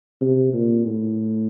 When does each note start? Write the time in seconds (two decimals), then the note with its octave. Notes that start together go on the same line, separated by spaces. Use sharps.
0.21 C3
0.53 A#2
0.86 A2